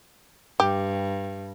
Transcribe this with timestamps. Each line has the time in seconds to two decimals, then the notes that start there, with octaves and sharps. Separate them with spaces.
0.60 G2 G4